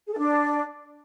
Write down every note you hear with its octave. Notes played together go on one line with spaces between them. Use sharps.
G#4
A4
D4